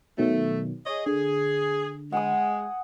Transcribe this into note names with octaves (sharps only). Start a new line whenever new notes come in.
B2 D#3 F#3 A3
G#4 C#5 D#5
D3 G#4
G#3 F#5 G#5 D#6